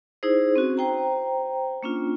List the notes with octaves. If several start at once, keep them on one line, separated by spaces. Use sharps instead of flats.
D#4 E4 G#4 C5
C4 C#4 F#4
C5 G5 A#5
A#3 C#4 D4 F4